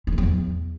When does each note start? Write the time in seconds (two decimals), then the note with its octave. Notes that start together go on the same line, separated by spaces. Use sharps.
0.07 E3
0.12 D#3
0.18 F#3
0.23 E2